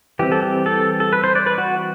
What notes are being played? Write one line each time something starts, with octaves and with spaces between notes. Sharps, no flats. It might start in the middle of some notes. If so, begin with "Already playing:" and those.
E3 G3 C4 G4
A4
G4
A4
A4
B4
C5
D5
B4
F#4